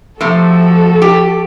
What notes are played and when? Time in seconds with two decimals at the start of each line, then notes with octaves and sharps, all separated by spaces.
0.21 C3 F3 A3 F#4 A4
1.02 G4